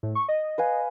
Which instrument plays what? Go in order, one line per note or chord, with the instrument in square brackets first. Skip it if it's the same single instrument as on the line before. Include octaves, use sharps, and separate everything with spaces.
[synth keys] A2
C#6
D#5
[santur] B4 F5 G#5